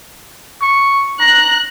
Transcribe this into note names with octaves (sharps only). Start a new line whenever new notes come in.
C#6
A#5 F#6